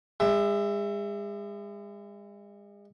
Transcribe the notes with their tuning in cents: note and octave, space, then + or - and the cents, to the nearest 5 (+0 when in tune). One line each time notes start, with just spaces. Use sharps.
G#3 -40 E5 +15